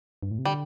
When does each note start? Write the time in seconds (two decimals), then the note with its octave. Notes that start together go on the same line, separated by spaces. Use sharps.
0.23 G2
0.31 A2
0.39 C3
0.45 D3 G3